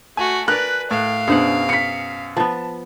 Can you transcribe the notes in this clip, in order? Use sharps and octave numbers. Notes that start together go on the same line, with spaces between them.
A3 F#4 G#5
A#4 B4 D5 F#6
A2 F5
F#2 B2 D4 G#4 C5 F#5
B6 C#7
F3 B3 A5